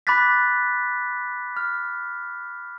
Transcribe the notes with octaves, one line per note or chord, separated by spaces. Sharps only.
B5 D6 F#6 A6 B6
F6